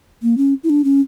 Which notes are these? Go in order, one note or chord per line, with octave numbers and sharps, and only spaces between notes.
A#3
C#4
E4
D4
C#4